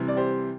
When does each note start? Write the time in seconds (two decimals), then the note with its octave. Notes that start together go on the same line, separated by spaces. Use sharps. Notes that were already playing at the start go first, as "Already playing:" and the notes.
Already playing: C3 E3 G3
0.08 D5
0.17 G4 C5